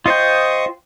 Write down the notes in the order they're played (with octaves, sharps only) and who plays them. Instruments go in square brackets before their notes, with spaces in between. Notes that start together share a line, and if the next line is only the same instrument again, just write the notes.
[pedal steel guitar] F4 C5 G5 [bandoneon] D#5 C#6 D#6